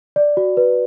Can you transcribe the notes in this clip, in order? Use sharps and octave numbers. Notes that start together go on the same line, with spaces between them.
D5
F#4
B4